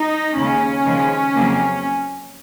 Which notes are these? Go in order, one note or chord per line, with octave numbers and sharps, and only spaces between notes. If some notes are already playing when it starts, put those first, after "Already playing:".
Already playing: D#4
D#2 C#3 G#3 C#4
D#2 C#3 F3 G#3
F2 C#3 F#3 A#3